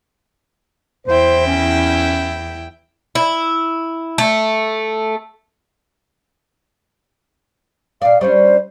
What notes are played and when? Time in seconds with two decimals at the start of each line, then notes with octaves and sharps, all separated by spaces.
1.07 E2 E4 C5 G5
1.47 C#4
3.15 E4
4.18 A3
8.02 A#2 D5 F5
8.21 G3 C#4 D4 C5